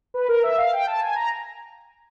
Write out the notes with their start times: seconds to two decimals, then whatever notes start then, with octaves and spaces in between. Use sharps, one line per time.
0.14 B4
0.29 A#4
0.43 E5
0.58 F5
0.73 G5
0.87 A5
1.02 G#5
1.16 A#5